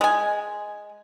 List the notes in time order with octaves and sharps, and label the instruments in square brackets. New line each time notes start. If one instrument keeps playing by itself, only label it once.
[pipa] G#3 G#5